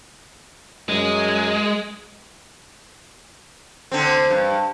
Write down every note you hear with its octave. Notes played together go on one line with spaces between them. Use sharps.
F#2 G#3
D3 C4
G2